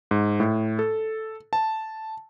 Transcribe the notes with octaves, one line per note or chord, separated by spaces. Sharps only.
G#2
A2
A4
A5